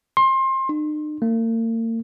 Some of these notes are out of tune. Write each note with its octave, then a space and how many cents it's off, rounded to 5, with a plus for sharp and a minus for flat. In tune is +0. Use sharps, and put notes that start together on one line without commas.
C6 +25
D#4 -45
A#3 -45